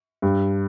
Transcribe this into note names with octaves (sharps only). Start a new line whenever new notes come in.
G2